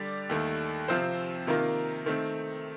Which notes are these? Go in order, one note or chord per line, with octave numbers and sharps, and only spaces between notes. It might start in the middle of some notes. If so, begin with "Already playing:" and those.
Already playing: D3 G3 D4 G4 D5
D#2 D#3 A3
C3 F3 C4 F4 C5
C3 D#3 A#3 F4 A#4
D#3 A3 C4